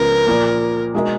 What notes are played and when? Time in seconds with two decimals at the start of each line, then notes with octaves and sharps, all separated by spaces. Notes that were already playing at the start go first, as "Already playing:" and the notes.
Already playing: C#2 C#3 F3 B3 A#4
0.27 A#2 F3 A#3
0.94 B2 G#3 D#4 A#4 D#5